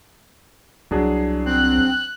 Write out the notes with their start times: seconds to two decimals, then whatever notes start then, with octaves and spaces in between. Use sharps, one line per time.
0.91 C2 F#3 D4 G#4
1.46 C4 F#6